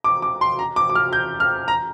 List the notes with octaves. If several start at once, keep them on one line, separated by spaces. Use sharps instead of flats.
D6
D6
C6
A#5
D6
D6
F6
G6
F6
A#5